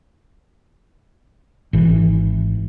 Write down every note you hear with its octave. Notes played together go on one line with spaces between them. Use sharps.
G#1 E3